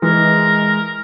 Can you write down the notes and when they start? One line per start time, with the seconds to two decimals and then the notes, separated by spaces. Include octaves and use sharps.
0.02 E3 G#3 A#4